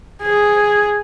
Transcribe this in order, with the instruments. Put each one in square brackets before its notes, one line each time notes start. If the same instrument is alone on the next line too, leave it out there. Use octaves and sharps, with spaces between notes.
[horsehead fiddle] G#4